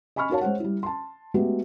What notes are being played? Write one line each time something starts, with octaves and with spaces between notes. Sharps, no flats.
D#5 G#5 B5 C#6 F6
D#4 F#4 A#4 C#5 F5 A5
G#3 C5 C#5 F#5
G3 E4
A5 C6
G#3 A3 B3 F#4 G4